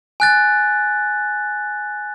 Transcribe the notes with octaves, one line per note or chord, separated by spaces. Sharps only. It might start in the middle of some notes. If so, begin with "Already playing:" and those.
G#5 F#6 A6